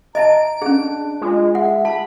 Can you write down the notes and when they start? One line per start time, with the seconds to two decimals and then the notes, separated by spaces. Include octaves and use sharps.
0.15 D#5 E5 A5 A#5 D7
0.62 C#4 D4 G#4
1.21 G#3 F4
1.55 E5 F#5
1.85 A5 B5